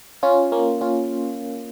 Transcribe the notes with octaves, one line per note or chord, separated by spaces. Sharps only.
C#4 F4
A#3 C#4
C#4 F4